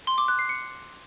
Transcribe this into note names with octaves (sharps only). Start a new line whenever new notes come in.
C6
D6
F#6
C7
C#7